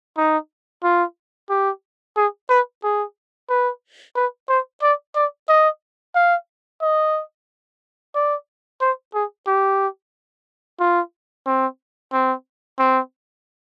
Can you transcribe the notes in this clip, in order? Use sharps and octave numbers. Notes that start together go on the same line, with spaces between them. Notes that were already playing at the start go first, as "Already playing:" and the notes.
D#4
F4
G4
G#4
B4
G#4
B4
B4
C5
D5
D5
D#5
F5
D#5
D5
C5
G#4
G4
F4
C4
C4
C4